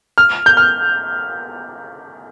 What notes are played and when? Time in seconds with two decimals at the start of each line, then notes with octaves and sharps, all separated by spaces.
0.18 F6
0.46 G6
0.57 F6